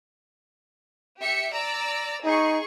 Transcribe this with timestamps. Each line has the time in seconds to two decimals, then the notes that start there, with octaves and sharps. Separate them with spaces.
1.20 G4 E5 C#7
1.52 D5 A#5 E6
2.25 D#4 G#4 C#6